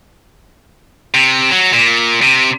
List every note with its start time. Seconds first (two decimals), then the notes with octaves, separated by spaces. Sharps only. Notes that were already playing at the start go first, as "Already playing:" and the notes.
1.14 C3
1.52 F#3
1.73 A#2
2.22 C3